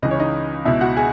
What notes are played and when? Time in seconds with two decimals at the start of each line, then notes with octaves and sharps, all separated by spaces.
0.02 C#2 C#3 E3 D#5
0.11 C#5
0.20 D#4 D#5
0.65 C#2 B2 E4 E5
0.81 F#4 F#5
0.97 G#4 G#5